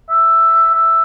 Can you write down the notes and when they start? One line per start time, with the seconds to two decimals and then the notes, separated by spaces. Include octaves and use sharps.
0.10 E5
0.74 E5